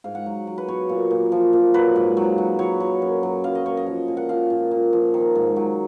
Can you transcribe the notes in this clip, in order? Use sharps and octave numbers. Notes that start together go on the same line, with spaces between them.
G#2 F5
F#5
F#3
F#3
B4
B2 C#5
A#2
A#2
F3
A#2
F#3 B4
G#2
F#3
F#3
F#3 C#5
F#3
F#2
F#3
F#2 F5
D#5
F#2 C#5
D#5
F3
A#2
F#5
F3 F5
A#2
A#2
F3
D#3
G#2
F#3